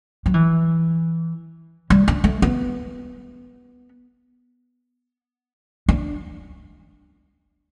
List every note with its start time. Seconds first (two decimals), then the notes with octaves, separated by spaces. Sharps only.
0.26 F#3
0.34 E3
1.90 G3
2.08 D4
2.24 A3
2.42 B3
5.89 D4